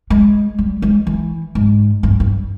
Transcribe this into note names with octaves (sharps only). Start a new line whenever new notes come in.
G#3
G3
G#3
E3
G#2
G2
G2